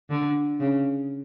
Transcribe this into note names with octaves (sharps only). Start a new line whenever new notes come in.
D3
C#3